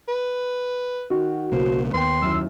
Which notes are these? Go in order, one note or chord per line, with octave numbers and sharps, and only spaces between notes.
B4
D#3 F#4
B1 C#3 A#3 C5
D#2 B3 G5 C6
F#2 E3 E6